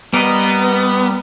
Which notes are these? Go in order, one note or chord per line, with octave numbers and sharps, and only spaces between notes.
G3 B3 A#4 D#5